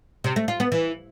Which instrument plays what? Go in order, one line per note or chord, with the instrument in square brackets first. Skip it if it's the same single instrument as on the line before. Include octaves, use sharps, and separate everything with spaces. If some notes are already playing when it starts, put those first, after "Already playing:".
[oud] C3
A3
F4
B3
E3